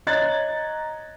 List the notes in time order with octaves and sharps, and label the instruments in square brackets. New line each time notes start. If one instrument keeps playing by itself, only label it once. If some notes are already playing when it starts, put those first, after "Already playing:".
[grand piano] C#5 D#5 A#5 F#6 G#6 A6